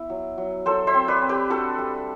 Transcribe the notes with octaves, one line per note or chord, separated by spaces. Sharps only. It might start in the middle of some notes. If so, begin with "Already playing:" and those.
Already playing: B3 E4
F#3
F#3
F#3 A4 C5
C5 E5
C4
B4 D5
C4
G4 B4
D4 F#4 A4
G3